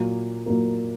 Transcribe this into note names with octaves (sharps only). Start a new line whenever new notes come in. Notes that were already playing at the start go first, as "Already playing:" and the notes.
Already playing: A#2 F#3 A#3
A#2 F#3 A#3